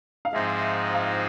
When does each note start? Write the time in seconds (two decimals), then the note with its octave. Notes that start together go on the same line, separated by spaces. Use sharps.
0.25 F5
0.32 G#2 F3 G#3 C4 D#4 E5
0.94 F5